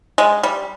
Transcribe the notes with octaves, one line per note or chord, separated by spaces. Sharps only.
G#3
G3